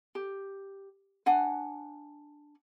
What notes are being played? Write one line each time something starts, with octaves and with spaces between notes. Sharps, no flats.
G4
D4 F#5 G#5